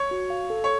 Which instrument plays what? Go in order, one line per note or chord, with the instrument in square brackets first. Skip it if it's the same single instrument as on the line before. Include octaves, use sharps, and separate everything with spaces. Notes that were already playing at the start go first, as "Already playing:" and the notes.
Already playing: [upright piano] C#5
[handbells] F#4
F5
A4
[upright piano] C#5